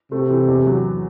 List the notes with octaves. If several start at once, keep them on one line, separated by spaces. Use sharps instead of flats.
C3 A3
E3
E2
F#3